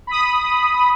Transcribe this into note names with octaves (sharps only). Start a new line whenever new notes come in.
B5 D#6